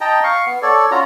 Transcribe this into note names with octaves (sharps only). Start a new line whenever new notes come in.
D#5 G5 A5 A#5
F5 C#6
B3
A4 C#5 D5
C#4 F4 F#4 A#5